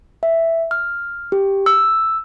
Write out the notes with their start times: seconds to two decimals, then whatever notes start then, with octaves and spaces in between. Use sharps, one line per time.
0.23 E5
0.71 F6
1.32 G4
1.66 E6